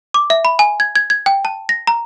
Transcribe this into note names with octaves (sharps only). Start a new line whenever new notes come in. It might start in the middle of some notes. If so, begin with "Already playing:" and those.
D6
E5
B5
G#5
G#6
G#6
G#6
G5
A5
A#6
A#5